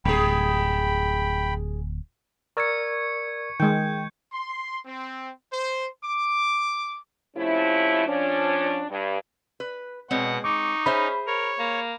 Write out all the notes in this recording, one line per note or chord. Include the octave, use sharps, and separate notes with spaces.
D1 G3 G#4 G5 B5
A#4 D5 C#6 E6 G#6 C#7
D#3 G#3 G5 G6 G#6
C6
C4
C5
D6
C3 F3 A3 C#4 E4
F3 C#4 D4
G2
B4
B2 G#3 C4 C#5 F#5
D#4 C#6 D6
C#4 G#4 C5 E5 B5
A#4 C#5
A#3